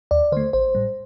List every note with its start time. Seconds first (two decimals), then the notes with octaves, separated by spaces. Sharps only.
0.11 D#2 D5
0.32 D3 A3 C5
0.53 A1 C5
0.75 A2 G3